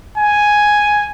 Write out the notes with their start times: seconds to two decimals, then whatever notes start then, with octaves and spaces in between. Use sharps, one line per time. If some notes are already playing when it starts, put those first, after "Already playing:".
0.17 G#5